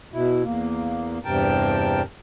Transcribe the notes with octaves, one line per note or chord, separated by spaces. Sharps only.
B2 E4
E2 A#3
E2 G2 C3 A#4 G5 A5